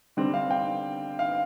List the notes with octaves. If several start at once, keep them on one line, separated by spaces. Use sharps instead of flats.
D3 G3 C4
F5
G5
F5